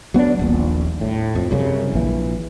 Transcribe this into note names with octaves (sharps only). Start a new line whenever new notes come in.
F#3 B3 C4 D4
D#1 A#1
A2
F2
C2 F#2 C#3
A#1 E3